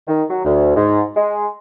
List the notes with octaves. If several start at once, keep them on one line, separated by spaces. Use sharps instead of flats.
D#3
F#3
D2
G#2
G#3